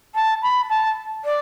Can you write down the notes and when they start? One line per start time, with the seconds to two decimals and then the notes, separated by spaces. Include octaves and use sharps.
0.15 A5
0.42 B5
0.69 A5
1.25 D5